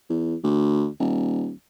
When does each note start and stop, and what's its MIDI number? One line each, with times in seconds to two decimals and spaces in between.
0.10 0.35 40
0.44 0.87 38
1.00 1.52 27